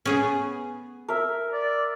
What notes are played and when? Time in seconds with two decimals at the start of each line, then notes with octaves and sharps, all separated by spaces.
0.05 B3 C#4 G#4
1.08 A#4 E5
1.53 D5